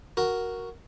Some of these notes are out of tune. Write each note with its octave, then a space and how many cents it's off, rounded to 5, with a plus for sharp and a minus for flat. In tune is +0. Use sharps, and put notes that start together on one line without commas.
F#4 +0 A#4 +0